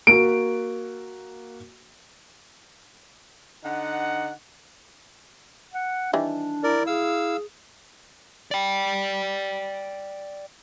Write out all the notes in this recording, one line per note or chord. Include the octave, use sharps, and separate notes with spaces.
A#3 F#4 D7
D3 D#4 F#5
F#5
D#3 E3 G3 D4
E4 A#4 D5
G#4 F5 E6
D5 G5